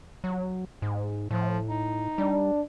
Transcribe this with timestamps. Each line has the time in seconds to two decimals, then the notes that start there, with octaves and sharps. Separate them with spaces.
0.24 F#3
0.82 G#2
1.31 A2 F3
1.69 D#4
2.18 G3 D4